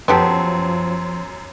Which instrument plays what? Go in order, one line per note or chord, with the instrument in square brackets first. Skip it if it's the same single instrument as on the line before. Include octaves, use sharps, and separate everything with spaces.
[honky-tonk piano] F#2 [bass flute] F3 [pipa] B3 G4 A4 [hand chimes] C6